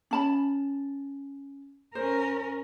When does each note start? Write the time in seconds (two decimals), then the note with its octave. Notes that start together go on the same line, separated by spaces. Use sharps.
0.11 C#4 A5 B5
1.95 C#4 A#4 C5